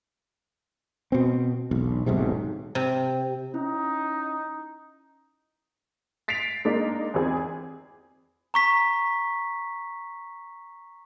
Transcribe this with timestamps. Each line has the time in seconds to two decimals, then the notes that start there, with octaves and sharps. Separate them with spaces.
1.12 B2 C4
1.71 E1 B1
2.06 D#1 B1 G#2 C3
2.75 C3
3.54 C#4 D#4 E4
6.28 A6 B6 C7 D7 F7
6.65 G#3 A#3 D4 D#4
7.14 E2 C4 G#4
8.54 A#5 C#6 B6